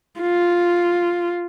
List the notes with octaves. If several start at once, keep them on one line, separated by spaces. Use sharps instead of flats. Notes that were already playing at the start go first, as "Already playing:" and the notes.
F4